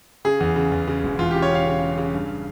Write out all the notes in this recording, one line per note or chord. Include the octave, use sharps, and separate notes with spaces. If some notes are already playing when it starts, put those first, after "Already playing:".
C#3 G#4
E2
C#3
E2
C#3
E1
E2 F4
G4
C#3
C#5
C#3 F5
C#3
C#3
C#3
G2